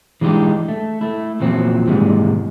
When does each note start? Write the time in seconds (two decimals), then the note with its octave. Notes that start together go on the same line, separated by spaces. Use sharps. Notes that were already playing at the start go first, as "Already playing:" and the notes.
0.21 E3 G#3 D4 D#4 G4
0.68 A3
1.01 A3 E4
1.40 E2 A#2 F3 F#3 C4
1.87 D#2 G#2 C3 E3 G3 G#3